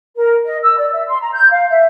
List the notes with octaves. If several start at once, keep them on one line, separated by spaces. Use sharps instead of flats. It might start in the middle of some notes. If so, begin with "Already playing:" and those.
A#4
D#5
E6
D5
E5
C6
A#5
G6
F5
E5